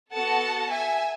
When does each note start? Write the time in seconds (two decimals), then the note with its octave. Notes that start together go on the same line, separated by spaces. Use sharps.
0.12 B3 F#4 A4 F#5 A5
0.71 E5 G#5